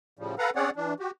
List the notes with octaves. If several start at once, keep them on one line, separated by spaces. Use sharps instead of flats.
A2 C#3 F3 G3
A4 B4 F5 F#5 A#5
C4 C#4 G#4 C#5 D5 F#5
E3 D4
F#4 G4